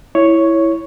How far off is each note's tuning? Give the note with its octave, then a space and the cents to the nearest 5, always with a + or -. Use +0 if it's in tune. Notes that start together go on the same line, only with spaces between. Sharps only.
E4 +0 C#5 +0